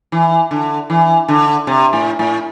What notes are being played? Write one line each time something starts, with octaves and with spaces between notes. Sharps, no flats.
E3
D3
E3
D3
C3
A2
A2